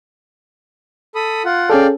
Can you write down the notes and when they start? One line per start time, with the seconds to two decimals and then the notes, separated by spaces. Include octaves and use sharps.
1.15 A4 B5 D#6
1.45 F4 F#5
1.70 C#4 G#4 A4 D5 F5 G5